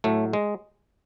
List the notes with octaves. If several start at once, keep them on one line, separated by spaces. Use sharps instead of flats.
A2 F#3 A3
G#3